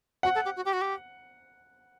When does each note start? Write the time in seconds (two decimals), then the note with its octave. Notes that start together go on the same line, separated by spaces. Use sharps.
0.23 F#4 F#5
0.35 A4
0.45 G4
0.56 F#4
0.65 G4
0.73 F#4
0.81 G4